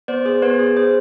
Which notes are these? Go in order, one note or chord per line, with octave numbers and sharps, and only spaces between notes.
B3 C5 D5
G#4 C5
B3 B4 C#5
G#4
G#4 C5